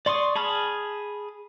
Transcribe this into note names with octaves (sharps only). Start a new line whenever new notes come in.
D5 C6 C#6 D#6
G#4 A5 B5 D#6 F6